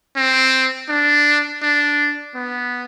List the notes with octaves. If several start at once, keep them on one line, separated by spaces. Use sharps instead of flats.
C4
D4
D4
B3